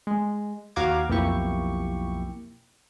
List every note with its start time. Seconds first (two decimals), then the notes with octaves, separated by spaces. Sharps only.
0.07 G#3
0.76 D#2 F#4 F5 A#5 D6 G#6
1.08 B1 F2 A#3 E4 G4 C#6